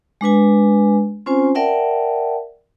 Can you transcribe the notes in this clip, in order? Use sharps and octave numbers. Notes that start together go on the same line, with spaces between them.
G#3 D4 B4 G#5
C4 C#4 F4 C5 G#5
A#4 D5 E5 F#5 G5 A5